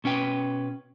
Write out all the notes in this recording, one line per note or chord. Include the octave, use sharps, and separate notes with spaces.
B2 C#4 B4 G5